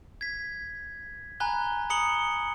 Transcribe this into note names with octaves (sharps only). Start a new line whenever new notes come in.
G#6 B6
G#5 A#5 B5 F#6 G7
A#5 B5 D#6 C#7 F#7 G7